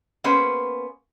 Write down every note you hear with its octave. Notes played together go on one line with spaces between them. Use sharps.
A#3 B3 C#4 G#4 B4 C5